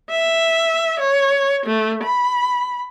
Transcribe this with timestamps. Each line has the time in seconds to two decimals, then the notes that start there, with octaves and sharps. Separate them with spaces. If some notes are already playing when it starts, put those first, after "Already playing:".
0.11 E5
1.00 C#5
1.66 A3
2.03 B5